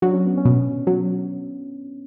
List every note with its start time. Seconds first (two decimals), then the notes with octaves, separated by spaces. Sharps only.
0.02 F#3 D4
0.14 C#4
0.26 B3
0.38 C#4
0.45 B2
0.87 F#3